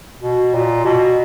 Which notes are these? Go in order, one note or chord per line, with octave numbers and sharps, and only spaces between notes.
B2
A#2
B2